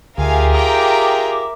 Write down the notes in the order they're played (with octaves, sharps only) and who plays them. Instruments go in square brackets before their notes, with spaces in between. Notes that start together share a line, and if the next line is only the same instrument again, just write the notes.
[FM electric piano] D2 [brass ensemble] F4 G4 G#4 [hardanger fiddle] A#4 E5 [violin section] F5 G#5
[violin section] G5 A#5 [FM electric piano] D6